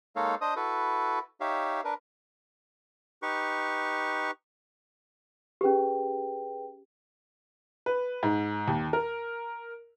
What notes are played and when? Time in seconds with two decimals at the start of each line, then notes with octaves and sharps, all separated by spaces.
0.16 G#3 A#3 D#4 A4 C#5 F5
0.41 D4 C5 D#5 D#6
0.56 E4 F#4 A4 B4
1.40 D#4 G4 C#5 E5 F5
1.84 D4 A#4 B4
3.22 D#4 G4 B4 C#6
5.61 C#4 G4 G#4 B4 G5
7.86 B4
8.23 G#2
8.68 D#2
8.93 A#4